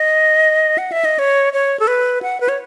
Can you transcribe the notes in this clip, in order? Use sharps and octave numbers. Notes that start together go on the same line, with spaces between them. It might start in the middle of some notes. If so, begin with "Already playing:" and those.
Already playing: D#5
F#5
E5
D#5
C#5
C#5
A4
B4
F#5
B4
C#5